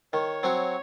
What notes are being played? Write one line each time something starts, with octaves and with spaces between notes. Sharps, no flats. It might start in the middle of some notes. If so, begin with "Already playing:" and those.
D#3 C#5
F#3 C4 F#4